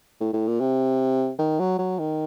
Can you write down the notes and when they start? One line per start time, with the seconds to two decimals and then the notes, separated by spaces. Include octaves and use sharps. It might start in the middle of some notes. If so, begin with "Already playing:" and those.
0.21 A2
0.33 A2
0.48 A#2
0.60 C3
1.39 D#3
1.59 F#3
1.79 F#3
1.99 D#3